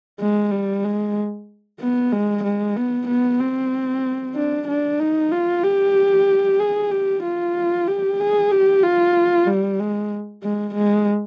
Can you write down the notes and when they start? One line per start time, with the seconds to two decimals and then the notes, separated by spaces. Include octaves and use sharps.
0.20 G#3
0.51 G3
0.84 G#3
1.80 B3
2.12 G#3
2.43 G#3
2.76 B3
3.07 B3
3.40 C4
4.35 D4
4.68 D4
5.00 D#4
5.32 F4
5.63 G4
6.59 G#4
6.91 G4
7.23 F4
7.87 G4
8.19 G#4
8.51 G4
8.83 F4
9.47 G3
9.79 G#3
10.43 G#3
10.75 G#3